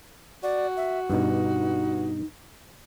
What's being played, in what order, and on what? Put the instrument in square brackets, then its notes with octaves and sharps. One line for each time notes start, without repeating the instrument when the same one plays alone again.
[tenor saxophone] F#4 [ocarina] D5
[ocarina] E5
[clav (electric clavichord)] G2 B2 [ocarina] D#4